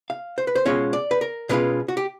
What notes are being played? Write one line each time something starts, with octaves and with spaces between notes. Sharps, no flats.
F5
C5
B4
C5
B2 G#3 C#4 F4 C#5
D5
B4
A#4
B2 G#3 C#4 F4 B4
F#4
G4